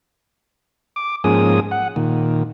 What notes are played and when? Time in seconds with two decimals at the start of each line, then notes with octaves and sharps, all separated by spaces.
0.96 D6
1.24 G#2 F3 A#3 C#4 G#4 D#6
1.71 F#5
1.96 A#2 D#3